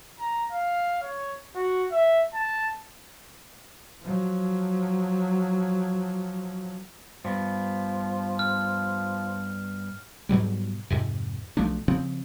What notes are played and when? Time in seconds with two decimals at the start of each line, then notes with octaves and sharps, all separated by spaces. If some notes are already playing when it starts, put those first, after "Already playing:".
0.20 A#5
0.52 F5
1.02 C#5
1.55 F#4
1.92 E5
2.34 A5
4.03 F3 F#3
7.25 G2 F3 B3
8.39 F6
10.29 G#2 B2 F#3 G3
10.90 F2 G#2 C3
11.57 B1 F3 A3 D4
11.88 C#3 F3 C4